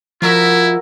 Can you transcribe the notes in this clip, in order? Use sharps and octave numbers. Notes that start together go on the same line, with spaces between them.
F3 E4 F#4 A#4 E5